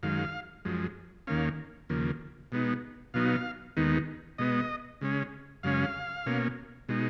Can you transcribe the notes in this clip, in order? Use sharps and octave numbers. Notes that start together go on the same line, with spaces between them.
F#2 D#3 G#3 F5
F#2 F3 G#3
D#2 D#3 A#3 C#4 F5
D#2 C#3 F3 A#3
B2 G#3 B3 D#4
B2 F#3 B3 D#4 F5
D#2 D#3 G#3 B3 D#4
B2 G#3 B3 D#5
C#3 G#3 C#4
F#2 C#3 G#3 C#4 F5
B2 A#3 C#4
B2 G#3 D#4